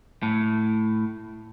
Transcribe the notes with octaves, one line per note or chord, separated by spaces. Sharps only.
A2